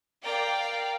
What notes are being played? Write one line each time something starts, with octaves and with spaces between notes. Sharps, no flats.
A#4 D5 F5 G5 A#5